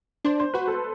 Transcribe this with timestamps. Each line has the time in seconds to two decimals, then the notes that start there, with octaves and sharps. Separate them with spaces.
0.24 D4 C5
0.40 C5
0.54 F#4 B4
0.68 A4